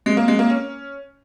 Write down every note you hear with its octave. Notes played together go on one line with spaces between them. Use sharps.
G#3
A#3
G#3
A#3
C#4